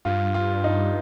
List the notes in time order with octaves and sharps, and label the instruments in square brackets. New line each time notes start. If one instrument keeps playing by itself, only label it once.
[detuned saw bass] G2 [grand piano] F4
[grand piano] F4
D#4